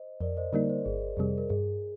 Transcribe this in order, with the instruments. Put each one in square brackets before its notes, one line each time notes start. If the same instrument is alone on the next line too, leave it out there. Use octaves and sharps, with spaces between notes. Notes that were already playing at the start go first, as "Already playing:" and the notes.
Already playing: [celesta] C5 D#5
[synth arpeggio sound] F2 [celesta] A#4 D5
[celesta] C5 D#5
[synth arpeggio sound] D3 G3 A#3 D#4 [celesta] A#4 D5
[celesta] C5
[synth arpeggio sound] G1 [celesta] G#4
[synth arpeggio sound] F2 C3 G3 [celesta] G#4
[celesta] A#4
[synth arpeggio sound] G2 [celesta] G#4